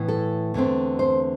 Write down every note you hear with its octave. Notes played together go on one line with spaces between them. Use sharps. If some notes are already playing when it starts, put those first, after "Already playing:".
Already playing: A2 E3 B3
A4
E2 D3 A3 C4
C5